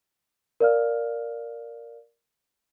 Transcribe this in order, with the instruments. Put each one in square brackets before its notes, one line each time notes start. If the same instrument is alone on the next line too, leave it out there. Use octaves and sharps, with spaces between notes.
[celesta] A#4 D5 F5 F6